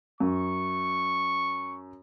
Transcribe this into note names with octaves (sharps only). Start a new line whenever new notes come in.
F#2 C#6